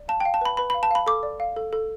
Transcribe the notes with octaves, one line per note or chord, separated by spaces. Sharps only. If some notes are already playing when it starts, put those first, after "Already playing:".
Already playing: D5
F5 A5
G5
F5
A5
B4 B5
B4 B5
F5 B5
A5
F5 B5
A4 D6
D5
F5
A4
A4